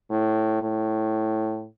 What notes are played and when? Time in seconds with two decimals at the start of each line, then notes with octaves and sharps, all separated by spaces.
0.11 A2
0.62 A2